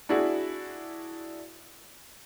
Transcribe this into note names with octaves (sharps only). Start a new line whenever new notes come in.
D4 E4 F#4 G#4